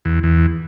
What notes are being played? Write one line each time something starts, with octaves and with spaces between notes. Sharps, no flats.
E2
E2